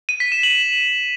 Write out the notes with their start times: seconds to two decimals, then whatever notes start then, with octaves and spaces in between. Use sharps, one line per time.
0.09 D#7
0.20 B6
0.32 E7
0.43 F#7